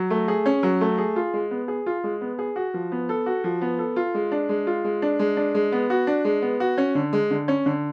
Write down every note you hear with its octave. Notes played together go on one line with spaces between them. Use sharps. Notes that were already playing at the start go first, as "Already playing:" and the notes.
Already playing: F#3
A3
G#4
C#4
F#3
A3
G#4
F4
G#3
B3
G#4
F4
G#3
B3
G#4
F#4
F3
B3
A4
F#4
F3
B3
A4
F4
G#3
D4
G#3
F4
G#3
D4
G#3
D4
G#3
B3
F#4
D4
G#3
B3
F#4
C#4
D3
G#3
D3
C#4
D3